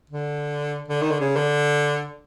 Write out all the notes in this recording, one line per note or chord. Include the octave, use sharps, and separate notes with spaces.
D3
D3
D#3
D3
C#3
D3